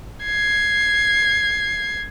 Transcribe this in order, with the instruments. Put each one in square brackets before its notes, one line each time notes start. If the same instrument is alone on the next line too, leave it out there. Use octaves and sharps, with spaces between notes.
[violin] G#6 C7